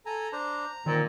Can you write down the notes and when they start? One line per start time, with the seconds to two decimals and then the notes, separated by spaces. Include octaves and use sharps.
0.06 A4 G#5 A#5
0.33 D4 C5 A#5
0.86 A#2 D#3 C4